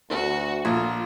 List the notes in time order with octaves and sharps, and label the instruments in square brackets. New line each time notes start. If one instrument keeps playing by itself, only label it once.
[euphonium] D2 [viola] F#4
[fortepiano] A#1 [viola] F4